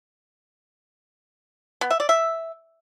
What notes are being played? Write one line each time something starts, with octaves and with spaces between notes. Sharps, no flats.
B3
E5
D5
E5